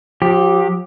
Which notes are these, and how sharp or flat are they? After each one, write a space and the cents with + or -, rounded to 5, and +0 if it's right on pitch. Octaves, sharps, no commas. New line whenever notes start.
F3 +45 G4 +0